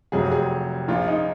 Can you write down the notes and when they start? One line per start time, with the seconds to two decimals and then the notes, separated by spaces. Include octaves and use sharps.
0.12 F1 F2 C3 F#3 G#4
0.31 G#4
0.88 A#1 A#2 F3 F4
1.07 D#4